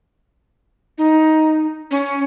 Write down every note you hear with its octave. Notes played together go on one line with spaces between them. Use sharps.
D#4
C#4